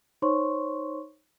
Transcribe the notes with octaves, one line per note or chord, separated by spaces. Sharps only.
D#4 C5 C#5 C6 C#6